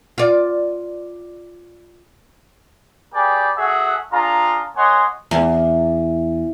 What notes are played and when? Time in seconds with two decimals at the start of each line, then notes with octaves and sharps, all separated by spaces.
0.18 F4 D5
3.14 G4 G#4 B4 D5 G5 G#5
3.58 F#4 G#4 A4 E5 F#5
4.13 D4 F4 G#4 A#5
4.77 A#3 C#5 D#5 F#5 G#5 C6
5.31 E2